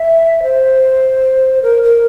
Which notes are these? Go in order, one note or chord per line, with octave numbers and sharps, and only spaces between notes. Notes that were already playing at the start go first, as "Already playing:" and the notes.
Already playing: E5
C5
A#4
A#4